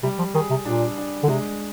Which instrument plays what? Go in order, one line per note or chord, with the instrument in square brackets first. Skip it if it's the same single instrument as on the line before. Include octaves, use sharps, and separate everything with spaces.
[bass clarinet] C3 [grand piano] G3
[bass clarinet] F3
[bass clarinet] D#3 [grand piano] G#4
[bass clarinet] C3
[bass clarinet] A#2 [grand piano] D4
[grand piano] D4
[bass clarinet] D3
[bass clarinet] C3 [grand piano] G#3